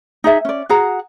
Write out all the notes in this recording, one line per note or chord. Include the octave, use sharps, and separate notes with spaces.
D#4 G#4 E5
C#4 D5
F#4 G#4 F#5 A#5